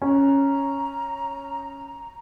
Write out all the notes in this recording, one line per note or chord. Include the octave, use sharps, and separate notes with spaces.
C#4 A#5